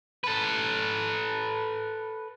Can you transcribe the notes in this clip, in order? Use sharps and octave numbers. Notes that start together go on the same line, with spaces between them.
A4 B4